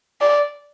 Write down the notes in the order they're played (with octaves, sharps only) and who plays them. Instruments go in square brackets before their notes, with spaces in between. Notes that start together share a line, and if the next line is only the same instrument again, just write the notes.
[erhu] D5